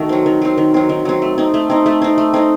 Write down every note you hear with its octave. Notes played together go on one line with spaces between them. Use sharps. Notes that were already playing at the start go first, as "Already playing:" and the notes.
Already playing: D#3 A3 F#4
F#3 C4
D#3
F#3 C4
D#3
F#3 C4
D#3
F#3 C4
A3
C4 D#4
A3
C4 D#4
A3
C4 D#4
A3
C4 D#4